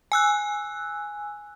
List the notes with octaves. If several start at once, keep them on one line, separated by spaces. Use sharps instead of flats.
G#5 E6 F#6